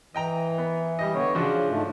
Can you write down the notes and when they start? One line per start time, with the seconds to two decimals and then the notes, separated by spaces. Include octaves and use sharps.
0.14 E3 D#5 G5 A#5
0.58 B3
0.99 G3 G4 D#5
1.15 D3 B3 C#5
1.35 C#3 F3 D4 F#4
1.69 G#2 A3